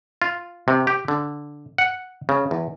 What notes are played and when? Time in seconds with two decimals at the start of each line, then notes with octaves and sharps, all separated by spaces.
0.22 F4
0.68 C3
0.87 G4
1.08 D3
1.78 F#5
2.29 C#3
2.51 E2